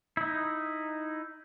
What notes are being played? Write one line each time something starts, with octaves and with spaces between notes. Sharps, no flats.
D#4 E4